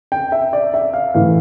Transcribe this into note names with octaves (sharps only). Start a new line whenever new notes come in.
G5
E5
D5
E5
F5
A2 E3 F5